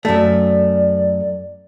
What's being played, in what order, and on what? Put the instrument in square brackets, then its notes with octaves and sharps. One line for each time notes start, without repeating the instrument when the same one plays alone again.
[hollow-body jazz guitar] F#2 A3 [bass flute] D5